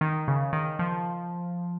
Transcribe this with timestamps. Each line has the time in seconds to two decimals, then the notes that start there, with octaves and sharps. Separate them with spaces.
0.01 D#3
0.28 C#3
0.53 D#3
0.79 F3